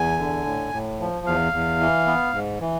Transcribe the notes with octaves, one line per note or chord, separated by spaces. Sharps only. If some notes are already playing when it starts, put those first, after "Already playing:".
Already playing: E2 G#5
D3
A2
A2
F3
E2 F5
E2
E3
B3
G#2
E3